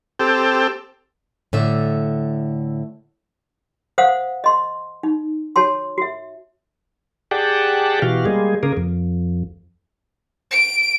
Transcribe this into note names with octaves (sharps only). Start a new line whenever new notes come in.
C4 G4 A4
A2 D3 D5 E5
C5 F5 F#5 D#6
D#5 C6
D#4
F#4 C#5 A5 C6
F#4 E5
G4 G#4 D5 F#5 G5 A5
B2 E3 F#4 G4 F5
G3 G#3 A#3 G#4
C#3 A#3 G#4 A#4
F2
D7